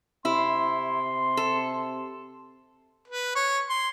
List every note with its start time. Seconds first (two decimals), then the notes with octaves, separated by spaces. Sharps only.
0.25 C3 E4 C6
1.37 A4
3.08 B4
3.35 C#5
3.69 C6